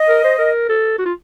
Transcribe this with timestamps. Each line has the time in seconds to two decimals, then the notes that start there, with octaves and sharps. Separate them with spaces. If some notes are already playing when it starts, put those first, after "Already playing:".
Already playing: D#5
0.08 A#4
0.24 C5
0.38 A#4
0.69 A4
0.99 F#4
1.05 F4